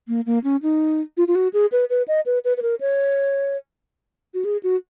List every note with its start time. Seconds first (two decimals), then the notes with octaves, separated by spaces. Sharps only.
0.08 A#3
0.26 A#3
0.44 C#4
0.63 D#4
1.17 F4
1.28 F4
1.35 F#4
1.53 G#4
1.72 B4
1.90 B4
2.08 D#5
2.26 B4
2.45 B4
2.57 B4
2.62 A#4
2.80 C#5
4.34 F#4
4.45 G#4
4.63 F#4